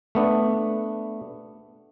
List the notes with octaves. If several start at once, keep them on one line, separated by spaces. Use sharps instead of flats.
A3 B3 D4